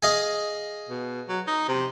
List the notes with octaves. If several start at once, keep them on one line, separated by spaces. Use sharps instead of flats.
G#4 D#5 F5
B2
F#3
D#4
C3